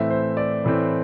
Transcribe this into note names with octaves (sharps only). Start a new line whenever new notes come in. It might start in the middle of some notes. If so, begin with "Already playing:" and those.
Already playing: A2 E3 A3 C4 E5
C5
D5
A2 E3 A3 C4